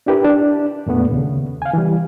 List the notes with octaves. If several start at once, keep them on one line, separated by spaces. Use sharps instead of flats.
D4 E4 G4 A#4 B4
D4
F2 A#2 A3 B3
D#2 C#3
F5 G#5
E3 G3